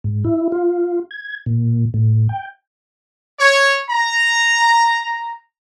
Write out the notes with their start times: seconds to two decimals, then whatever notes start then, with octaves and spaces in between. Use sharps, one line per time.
0.04 G#2
0.24 E4
0.52 F4
1.11 G#6
1.46 A#2
1.94 A2
2.29 G5
3.39 C#5
3.90 A#5